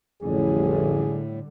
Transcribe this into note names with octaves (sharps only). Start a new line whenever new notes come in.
A1 F2 A2 D3 G3 G#4